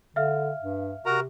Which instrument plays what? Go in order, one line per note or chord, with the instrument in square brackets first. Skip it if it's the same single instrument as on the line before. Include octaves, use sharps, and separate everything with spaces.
[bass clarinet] D3 [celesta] E5 F5 F6
[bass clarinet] G2
[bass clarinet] C3 [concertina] F#4 A#4 A#5